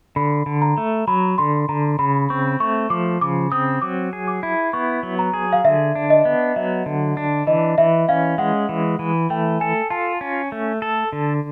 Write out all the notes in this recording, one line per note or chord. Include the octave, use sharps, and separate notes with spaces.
D3 B5
D3
A#5
A3
F#3 B5
D3 C6
D3 A#5
C#3 B5
C4 C#6
A3 C#6
F3 D6
C#3 D6
C4 D#6
F#3 D6
G#4
D6
E4
B3 C#6
F#3
A#5
G#4
F5
D3 E5
D4
D#5
B3
F#3 E5
D3
D4
E3 D#5
E3 E5
C#4 F5
G#3 F#5
E3
E3
A3 G5
A4 G#5
F4 A5
C#4
A3
A4
D3